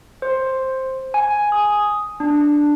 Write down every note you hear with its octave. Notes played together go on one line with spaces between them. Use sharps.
C5
G#5
D#6
D4